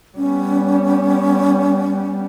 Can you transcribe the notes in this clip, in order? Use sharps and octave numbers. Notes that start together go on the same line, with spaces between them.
G3 B3 C#4